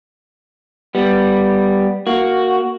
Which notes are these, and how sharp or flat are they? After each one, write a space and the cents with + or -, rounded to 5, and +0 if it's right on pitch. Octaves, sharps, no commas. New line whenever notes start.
G3 +0 B3 +0
A#3 -5 F#4 +0